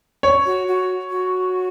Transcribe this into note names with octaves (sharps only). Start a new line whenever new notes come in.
C#5
F#4
F#4
F#4